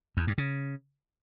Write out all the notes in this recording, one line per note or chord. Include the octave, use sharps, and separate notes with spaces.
E2
G2
C#3